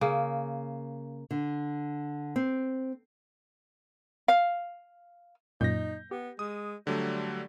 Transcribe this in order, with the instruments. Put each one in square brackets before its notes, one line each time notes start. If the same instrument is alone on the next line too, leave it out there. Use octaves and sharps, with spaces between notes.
[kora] C#3 A#3
[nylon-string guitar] D3
C4
[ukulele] F5
[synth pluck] F#2 A#2 [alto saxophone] D#4 [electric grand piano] G6 A#6
[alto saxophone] B3 [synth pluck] G4
[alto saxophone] G#3 [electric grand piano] D#6
[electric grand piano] D3 F#3 A3 [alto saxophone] G3